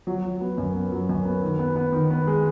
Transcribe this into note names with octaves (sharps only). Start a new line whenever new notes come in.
F#3
F#3
B3
F#2
B3
F#3
F#2
B3
D#3
B3
B3
D#3
B3
G#3